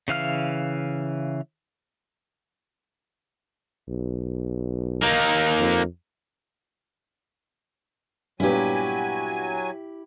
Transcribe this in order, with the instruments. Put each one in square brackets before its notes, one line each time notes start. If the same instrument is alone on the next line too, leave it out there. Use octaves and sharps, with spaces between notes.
[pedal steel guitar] C#3 E3 F5 F6
[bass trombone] B1
[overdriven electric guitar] A#3 D#4
[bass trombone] F2
[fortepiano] G2 A#2 B3 [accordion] F#3 G#5 [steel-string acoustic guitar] E4 G4